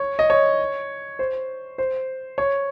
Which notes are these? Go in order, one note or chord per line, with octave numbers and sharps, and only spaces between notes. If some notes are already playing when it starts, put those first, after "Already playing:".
Already playing: C#5
D#5
C#5
C5
C5
C#5